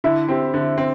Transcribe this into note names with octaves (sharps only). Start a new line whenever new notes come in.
D3 E4
C4 G4
D3
C4